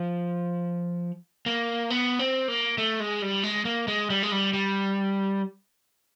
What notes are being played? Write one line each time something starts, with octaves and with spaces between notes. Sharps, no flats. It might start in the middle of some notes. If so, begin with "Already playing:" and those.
Already playing: F3
A#3
B3
C4
A#3
A3
G#3
G3
G#3
A#3
G#3
G3
G#3
G3
G3